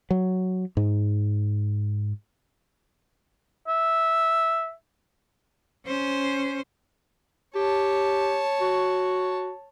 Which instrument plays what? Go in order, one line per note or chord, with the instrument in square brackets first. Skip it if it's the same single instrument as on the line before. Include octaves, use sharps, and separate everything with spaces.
[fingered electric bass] F#3
G#2
[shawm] E5
[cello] C#4 C5
[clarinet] G4 [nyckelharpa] C#5 A5
[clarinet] F#4